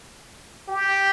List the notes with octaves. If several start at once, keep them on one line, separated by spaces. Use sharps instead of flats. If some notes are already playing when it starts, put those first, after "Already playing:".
G4